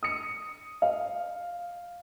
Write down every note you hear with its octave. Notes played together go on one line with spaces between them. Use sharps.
D#6 C#7
F5